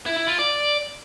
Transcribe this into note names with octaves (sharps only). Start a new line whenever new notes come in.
E4
E4
F4
D5